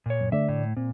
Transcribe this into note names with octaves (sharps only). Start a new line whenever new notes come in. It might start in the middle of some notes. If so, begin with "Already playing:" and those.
A#2 C#5
F#2
D3 A3 D5 E5
A2
A#2 C4